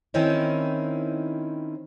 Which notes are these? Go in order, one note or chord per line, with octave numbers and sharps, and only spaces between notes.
D#3 C4 C#4 D#4 E4